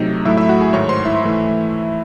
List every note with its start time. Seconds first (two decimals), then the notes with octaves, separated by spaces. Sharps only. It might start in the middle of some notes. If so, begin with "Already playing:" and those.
Already playing: C3 F#3 A3 D#4 D#5
0.25 A2 F#3 A3 E4 E5
0.37 E4 E5
0.49 F#4 F#5
0.61 G#4 G#5
0.73 G#2 D#3 A3 C#5 C#6
0.89 C5 C6
1.05 E4 E5
1.24 E3 A3